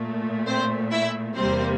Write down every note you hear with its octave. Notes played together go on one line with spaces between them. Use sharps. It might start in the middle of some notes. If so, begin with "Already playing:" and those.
Already playing: A#2 A3
C4 C5
E4 E5
E2 C3 G3 A#3 C4 C5